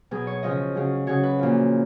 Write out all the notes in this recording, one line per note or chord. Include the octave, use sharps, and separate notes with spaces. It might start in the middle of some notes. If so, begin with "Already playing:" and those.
B2 F#3 G#4
C#5
C#3 F3 D#5
C#3 F#3
C#3 F#3 C#5
B4
A#2 F3